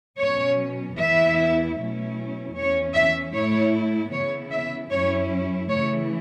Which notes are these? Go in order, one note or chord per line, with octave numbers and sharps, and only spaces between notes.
B2 F#3 C#4 C#5
E2 E3 B3 E4 E5
B2 F#3 A3 C#4 E4
E2 E3 C#4 C#5
E5
A2 A3 E4 C#5
C#3 E3 B3 E4 C#5
E5
F#2 F#3 C#4 E4 C#5
C#3 E3 A3 E4 C#5